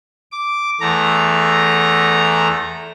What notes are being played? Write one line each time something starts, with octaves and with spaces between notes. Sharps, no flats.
D6
E2 A3 A#5